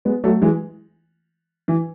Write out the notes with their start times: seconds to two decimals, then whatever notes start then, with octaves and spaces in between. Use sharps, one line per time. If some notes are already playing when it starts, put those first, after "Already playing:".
0.05 G#3 B3
0.24 F#3 A3
0.42 E3 G#3
1.68 E3